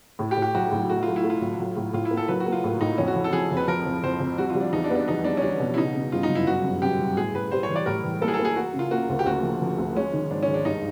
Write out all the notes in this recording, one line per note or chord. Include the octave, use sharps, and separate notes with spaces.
A2
G4
A2
G4
B1 F#4
A2
A3 F#4
A3 F4
E4
A3
F4
A2
F#3
A2
A2 F4
E4
A#3
A4
F#3 B4
F#4
A#3
F4
A2
A2 D#4
F2 C#4
F#4
F3
A4
F3 G#4
F2
B4
F3 A#4
F2
F2 C5
F2
G3 F#4
F4
G3
D4
E2 D#4
D4
B3
D4
E2 D#4
B3 D4
C#4
G3 D4
B2
E4
C#3 D#4
C#3
G1 F4
D#4
F#2
E4
G1 F#4
F#2
F#2 G4
G1
A2 G#4
A2 B4
G3 C5
C#5
E3
D5
A2 A#4
E3
A#3 A4
G#4
A4
A#3
G#4
A#3 F#4
C#3
F4
A#3 F#4
D2
G4
D2 F#4
F3
F3
D2
G#3 C#4
D#3
G#1 D4
C#4
D#3
D4
G2 D#4